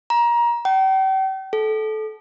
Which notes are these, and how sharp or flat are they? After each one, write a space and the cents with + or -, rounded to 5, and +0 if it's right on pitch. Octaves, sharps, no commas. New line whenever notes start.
A#5 +25
G5 -40
A4 -25